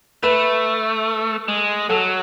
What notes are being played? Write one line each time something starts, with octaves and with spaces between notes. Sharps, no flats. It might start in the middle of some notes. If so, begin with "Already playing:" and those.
A3 B4
G#3
F#3 A4